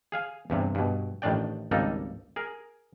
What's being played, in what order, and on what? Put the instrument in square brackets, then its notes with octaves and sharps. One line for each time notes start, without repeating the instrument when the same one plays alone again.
[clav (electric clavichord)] G#4 F5 G#5
E2 G2 C3
G2 B2
A1 A2 D#3 D4 D5 G5
G#1 C#2 G3 A#3 D#4 A4
G#4 A#4